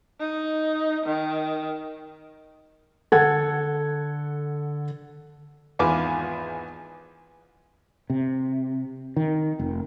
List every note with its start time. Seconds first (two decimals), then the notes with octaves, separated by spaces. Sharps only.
0.20 D#4
1.06 D#3
3.12 D3 A4 F#5 G#6
5.79 G#1 E2 F4 B4 G#5 D6
8.10 C3
9.16 D#3
9.59 F1